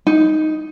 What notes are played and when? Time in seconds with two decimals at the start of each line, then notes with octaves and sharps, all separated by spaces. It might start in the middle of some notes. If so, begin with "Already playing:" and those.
0.07 D#4